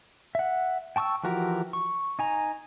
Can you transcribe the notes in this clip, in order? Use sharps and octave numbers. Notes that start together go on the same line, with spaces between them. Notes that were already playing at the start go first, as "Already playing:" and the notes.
E5 F#5
G5 A5 C#6 D#6 E6
E3 F3 F#4 G4 A#4
C#6
D#4 G#5 A#5